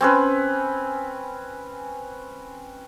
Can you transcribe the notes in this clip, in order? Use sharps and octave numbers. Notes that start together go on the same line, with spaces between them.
C4 C#4 B4